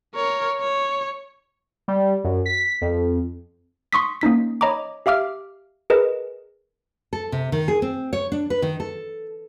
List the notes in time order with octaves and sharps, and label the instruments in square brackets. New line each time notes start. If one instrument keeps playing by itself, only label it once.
[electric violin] A#4 C#5
C#5
[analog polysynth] G3
F#2
B6
F2
[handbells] C6 C#6 D#6 B6
A#3 C#4 D#4 B6
C#5 D#5 A#5 B5 D6
G4 E5 F5 D6 F6
G#4 A#4 B4 D#5
[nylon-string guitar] A4
C3
D#3
G#4
C4
C#5
D4
B4
D#3
A4